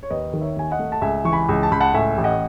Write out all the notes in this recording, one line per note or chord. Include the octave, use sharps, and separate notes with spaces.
C#5
D#2 B4 D#5
D#3
C#5 E5
D#2 G#5
D#5 F#5
A3
A5
C#2 E5 G#5
E3 C#6
G#5 B5
C#2
A5
C#2 B5
F#5 A5
A2 E5 G#5
A1
D#5 F#5